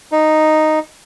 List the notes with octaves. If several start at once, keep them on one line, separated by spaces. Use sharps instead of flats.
D#4